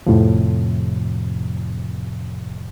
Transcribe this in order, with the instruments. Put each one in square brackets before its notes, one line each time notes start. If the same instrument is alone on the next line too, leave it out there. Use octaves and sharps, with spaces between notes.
[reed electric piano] F2 A2 C3 F3